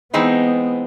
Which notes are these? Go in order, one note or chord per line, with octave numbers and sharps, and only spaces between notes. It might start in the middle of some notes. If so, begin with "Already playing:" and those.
E3 G#3 B3 C4 D#4